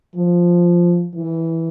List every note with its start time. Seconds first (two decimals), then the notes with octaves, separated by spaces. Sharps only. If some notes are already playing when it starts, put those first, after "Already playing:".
0.16 F3
1.15 E3